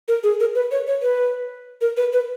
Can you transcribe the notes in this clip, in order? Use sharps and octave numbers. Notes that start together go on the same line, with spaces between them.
A#4
G#4
A#4
B4
C#5
C#5
B4
A#4
B4
B4